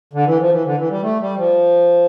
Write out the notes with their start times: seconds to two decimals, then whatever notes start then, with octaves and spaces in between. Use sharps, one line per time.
0.13 D3
0.26 E3
0.39 F3
0.52 E3
0.65 D3
0.77 E3
0.90 G3
1.03 A3
1.20 G3
1.37 F3